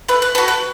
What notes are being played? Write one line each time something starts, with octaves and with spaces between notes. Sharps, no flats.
A3 B4
B4
F#4 A4 B4
B4